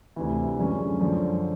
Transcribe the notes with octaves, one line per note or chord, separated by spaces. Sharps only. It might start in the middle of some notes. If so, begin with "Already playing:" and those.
D2 C3 E3
F#2 D3 F3 G#3 C#4
F#2 D3 F3